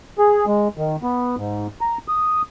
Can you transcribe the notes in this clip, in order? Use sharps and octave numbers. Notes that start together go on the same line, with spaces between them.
G#4
G#3
D#3
B3
G#2
A#5
D#6